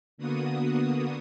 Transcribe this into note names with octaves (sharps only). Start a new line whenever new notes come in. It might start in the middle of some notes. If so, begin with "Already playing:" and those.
D3 A#3 B3 F#4 D#6